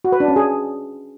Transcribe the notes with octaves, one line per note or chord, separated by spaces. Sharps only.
F#4
B4
D4
C#4
G#4